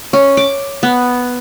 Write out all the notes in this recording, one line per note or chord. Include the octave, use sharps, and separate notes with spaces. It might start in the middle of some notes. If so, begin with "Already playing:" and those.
C#4
D6
B3